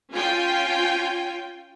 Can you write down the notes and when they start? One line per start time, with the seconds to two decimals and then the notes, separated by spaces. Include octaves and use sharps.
0.11 C#4 F4 G5 G#5